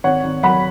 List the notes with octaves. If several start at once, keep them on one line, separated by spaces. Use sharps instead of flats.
G#1 C#5 F#5
G#1
F#3 F#5 B5